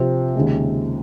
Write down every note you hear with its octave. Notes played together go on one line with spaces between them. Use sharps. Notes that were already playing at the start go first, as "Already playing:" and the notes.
Already playing: C3 F3 C4
D#2 C#3 G#3